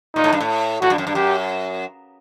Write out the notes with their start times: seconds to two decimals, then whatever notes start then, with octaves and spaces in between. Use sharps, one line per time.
0.15 A#2 D#4
0.24 A2
0.33 G2
0.41 A2
0.82 A2 F#4
0.90 G2
0.98 F#2
1.07 G2
1.15 F#2 G4